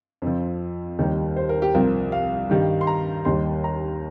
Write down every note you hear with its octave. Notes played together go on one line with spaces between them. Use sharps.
F2
F3
D#2 D#3 G3
C5
A#4
G4
C2 C3 F3 A#4
F5
G2 D#3 G3
C6
A#5
D#2 D#3 G3 C6
A#5